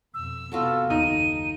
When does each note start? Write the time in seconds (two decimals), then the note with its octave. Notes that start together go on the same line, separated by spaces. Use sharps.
0.14 F2 B2 E6
0.52 C3 B3 F4 F#4 A4
0.90 F#1 D#2 D#4 D#7